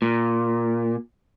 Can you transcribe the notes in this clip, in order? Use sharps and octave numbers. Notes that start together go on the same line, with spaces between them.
A#2